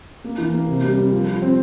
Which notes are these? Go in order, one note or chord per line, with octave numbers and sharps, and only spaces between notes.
A#3
E3
A#3
C3
G3
G3
F3
F3
C4